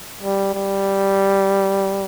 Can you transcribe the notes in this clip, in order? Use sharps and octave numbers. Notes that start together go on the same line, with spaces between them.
G3
G3